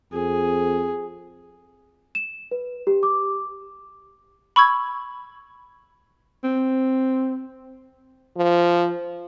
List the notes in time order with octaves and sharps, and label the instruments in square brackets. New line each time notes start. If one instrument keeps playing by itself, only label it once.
[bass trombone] F2 [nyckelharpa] G#4
[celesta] E7
B4
G4
D6
[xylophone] B5 C#6 E6 G#6
[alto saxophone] C4
[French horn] F3